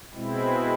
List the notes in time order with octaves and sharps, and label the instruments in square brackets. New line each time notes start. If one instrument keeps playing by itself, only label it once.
[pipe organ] B2 G#3 C4 E4